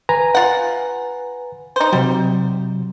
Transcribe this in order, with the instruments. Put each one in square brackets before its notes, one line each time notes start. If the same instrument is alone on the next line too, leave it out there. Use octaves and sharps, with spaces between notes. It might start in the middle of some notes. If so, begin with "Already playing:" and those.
[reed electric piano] B4 G#5 A#5
[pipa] F4 F#5
D#4 C5
[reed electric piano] C3 F#3 [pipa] G3